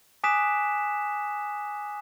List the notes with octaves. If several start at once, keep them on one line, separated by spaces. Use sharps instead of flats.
G#5 D6 D#6 F#6 B6 E7